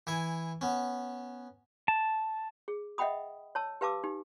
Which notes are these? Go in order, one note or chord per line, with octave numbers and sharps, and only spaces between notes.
E3 E4 G#5
B3 C#4
A5
G#4
D#5 E5 F#5 G5 B5 D#6
C#5 A5 E6
G4 B4 F5 A5 D6 E6
D#4 G4